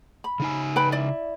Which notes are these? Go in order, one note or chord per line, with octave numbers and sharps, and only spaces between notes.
B5
C#3 D#4 G#5
B4 G5 B5
E4 D5